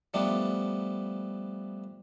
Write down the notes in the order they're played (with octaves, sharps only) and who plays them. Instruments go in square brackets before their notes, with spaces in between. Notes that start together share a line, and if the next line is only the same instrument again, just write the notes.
[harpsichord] F3 G3 A3 B3 D4